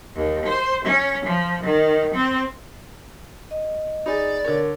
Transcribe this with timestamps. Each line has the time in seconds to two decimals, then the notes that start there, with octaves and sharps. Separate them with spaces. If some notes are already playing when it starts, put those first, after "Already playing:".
0.16 D#2
0.46 C5
0.85 C#4
1.26 F3
1.64 D#3
2.15 C4
3.51 D#5
4.06 D#4 G#4 D5 B5
4.45 D3 A#4 C#5